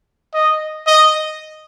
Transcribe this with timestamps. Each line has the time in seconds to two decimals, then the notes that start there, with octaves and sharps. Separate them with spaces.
0.34 D#5
0.87 D#5